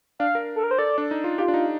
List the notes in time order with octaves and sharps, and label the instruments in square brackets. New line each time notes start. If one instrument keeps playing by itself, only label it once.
[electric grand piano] D4 [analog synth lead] F5
[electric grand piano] A#4
[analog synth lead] A4
A#4
C5
[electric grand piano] A4 [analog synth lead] D5
[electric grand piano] D4
D#4
F4
[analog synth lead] F4 [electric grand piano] G4
[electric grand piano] D4
D#4